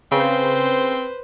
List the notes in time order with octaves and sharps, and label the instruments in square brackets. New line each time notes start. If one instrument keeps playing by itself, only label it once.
[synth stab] C#3 [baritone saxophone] C4 [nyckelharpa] B4 C5